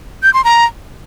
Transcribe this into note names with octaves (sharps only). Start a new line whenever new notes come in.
G6
C6
A#5